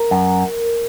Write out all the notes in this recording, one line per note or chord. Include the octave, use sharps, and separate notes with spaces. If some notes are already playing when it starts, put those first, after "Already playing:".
Already playing: A#4
F#2